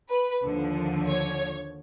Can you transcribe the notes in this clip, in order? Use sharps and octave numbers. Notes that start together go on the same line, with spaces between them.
B4
D#2 D3 F3
C#5